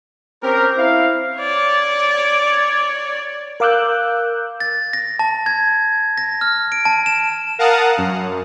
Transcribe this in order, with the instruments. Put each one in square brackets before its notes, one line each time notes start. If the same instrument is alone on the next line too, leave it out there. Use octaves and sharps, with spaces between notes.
[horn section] C4 C#4 G4 A#4
C4 E4 F5
[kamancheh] C#5 D5
[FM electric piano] A#4 F5 D6 E6 F#6 G6
[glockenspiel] A6
A#6
A5
G#6
A#6
F6
D7
A5
E7
[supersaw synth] A#4 F5 F#5 A5 A#5 D#6
F#2